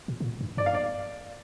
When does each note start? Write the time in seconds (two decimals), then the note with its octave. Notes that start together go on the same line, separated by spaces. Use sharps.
0.08 A#2
0.20 C3
0.25 A#2
0.41 G2
0.57 G2 D5
0.66 F5
0.74 D5